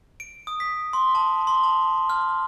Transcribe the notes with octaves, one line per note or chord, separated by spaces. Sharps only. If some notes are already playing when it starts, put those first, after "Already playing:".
D7
D#6
B6
C6
A5
C6
A5
F6